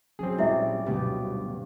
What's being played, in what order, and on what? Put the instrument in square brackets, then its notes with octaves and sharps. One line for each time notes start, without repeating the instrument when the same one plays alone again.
[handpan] F#3 C#4 [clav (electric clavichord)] C4 G#4
[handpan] A#2 D5 [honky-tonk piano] G3 [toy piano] E4 E5
[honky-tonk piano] D2 G2 [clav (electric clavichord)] B2 [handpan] F#3 G3 G4